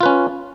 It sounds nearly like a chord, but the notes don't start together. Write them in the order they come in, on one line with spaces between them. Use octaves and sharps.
F4 B4 C#4